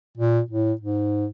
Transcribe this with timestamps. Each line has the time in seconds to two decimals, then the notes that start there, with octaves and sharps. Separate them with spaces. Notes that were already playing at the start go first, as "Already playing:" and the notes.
0.17 A#2
0.50 A2
0.81 G#2